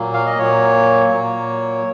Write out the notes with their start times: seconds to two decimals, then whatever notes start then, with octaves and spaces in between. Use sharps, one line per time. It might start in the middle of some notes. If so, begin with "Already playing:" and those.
Already playing: A#2 F#3 A#3
0.14 F5
0.26 D#5
0.39 A#2 F#3 A#3 C#5
1.11 A#2 F#3 A#3